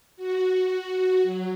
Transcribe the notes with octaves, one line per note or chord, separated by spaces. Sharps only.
F#4
F#3